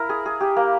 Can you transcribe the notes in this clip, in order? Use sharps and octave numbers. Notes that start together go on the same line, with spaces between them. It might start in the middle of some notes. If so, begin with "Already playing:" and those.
Already playing: E4 A#4
G#4
G#4
G4
A#3